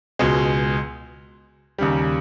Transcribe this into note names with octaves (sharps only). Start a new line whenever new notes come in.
C#2 B2 G#3
D#2 C#3 G3